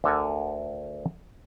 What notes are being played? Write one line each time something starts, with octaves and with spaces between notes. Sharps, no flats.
D2 D3 A4 A#4 G#5